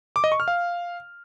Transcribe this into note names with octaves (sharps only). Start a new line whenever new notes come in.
D6
D#5
C#6
F6
F5